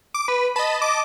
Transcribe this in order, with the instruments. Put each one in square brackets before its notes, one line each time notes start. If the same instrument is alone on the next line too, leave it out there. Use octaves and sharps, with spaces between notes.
[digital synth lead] D6
B4
[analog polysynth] D#5 A5 [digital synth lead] B5
[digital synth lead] D6